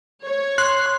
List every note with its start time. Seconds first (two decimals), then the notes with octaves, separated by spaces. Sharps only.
0.22 C#5
0.58 C6 F#6